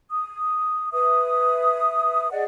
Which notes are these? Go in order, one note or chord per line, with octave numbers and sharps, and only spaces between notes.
D#6
B4 E5 D#6
G#4 D5 D#5 F#5